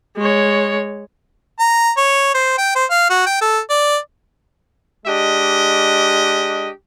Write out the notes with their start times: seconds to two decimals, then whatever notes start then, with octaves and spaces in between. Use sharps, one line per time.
0.17 G#3 C#5
1.59 A#5
1.97 C#5
2.34 C5
2.58 G5
2.76 C5
2.90 F5
3.10 F#4
3.27 G5
3.41 A4
3.70 D5
5.06 G#3 D4 G4 D#5